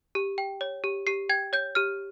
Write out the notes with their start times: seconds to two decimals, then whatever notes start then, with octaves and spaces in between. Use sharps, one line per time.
0.15 G4
0.38 G5
0.61 C#5
0.84 G4
1.07 G4 C7
1.29 G5 G#6
1.53 C#5 G6
1.75 G4 F6